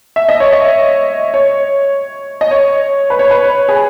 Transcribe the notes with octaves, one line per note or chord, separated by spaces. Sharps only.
E5
D#5
C#5
D#5
C#5
D#5
C#5
B4
C#5
B4
G#4